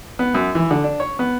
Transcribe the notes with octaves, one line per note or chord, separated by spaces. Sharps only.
B3
F#2
E3
D3
D4
C#5
B3